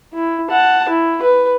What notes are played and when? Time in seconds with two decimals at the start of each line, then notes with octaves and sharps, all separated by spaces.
0.14 E4
0.51 F#5 A5
0.89 E4
1.22 B4